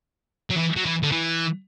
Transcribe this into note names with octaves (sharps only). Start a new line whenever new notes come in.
F#3
E3
F#3
E3
D3
E3